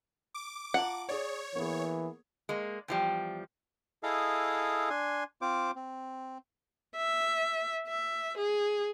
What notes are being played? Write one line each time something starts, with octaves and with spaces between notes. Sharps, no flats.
D6
F4 F#5 A5 A#5
G#4 C#5 D5
E3 A#3 B3 G#4
G#3 A#3 D5
E2 F3 G3 G5
E4 G#4 A4 D#5 F5
D4 G#5 C6
C4 F4 C5 D6
C4
E5
E5
G#4